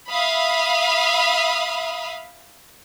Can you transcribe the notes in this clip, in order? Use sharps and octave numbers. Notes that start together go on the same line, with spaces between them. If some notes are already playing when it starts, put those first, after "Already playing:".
E5 F5 B5 D#6